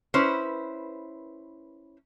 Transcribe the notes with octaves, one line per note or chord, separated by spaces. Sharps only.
C#4 E4 B4 C5